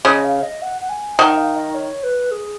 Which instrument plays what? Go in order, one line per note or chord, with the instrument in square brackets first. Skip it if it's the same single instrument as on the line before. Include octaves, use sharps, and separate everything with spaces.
[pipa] C#3 [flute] D#5
[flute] F5
D#5
F#5
F#5
G#5
[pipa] D#3 [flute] F#5
[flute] D#5
F5
D#5
C#5
B4
G#4